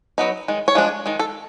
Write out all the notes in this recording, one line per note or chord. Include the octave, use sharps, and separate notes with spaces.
F#3 B3 D#4
D#3 G#3
C#5
F3 G#3 D4
D#3 G#3
A4